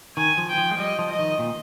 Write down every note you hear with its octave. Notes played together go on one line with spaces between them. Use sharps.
D#3 G#5
F3
G5
F3
G#3
G3 D#5
F3
D#5
D#3
A#2